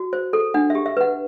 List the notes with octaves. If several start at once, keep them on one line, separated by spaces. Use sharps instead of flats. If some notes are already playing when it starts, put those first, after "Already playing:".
Already playing: F#4
C5
A4
D4 F#5
E5
G4
E5
B4 F#5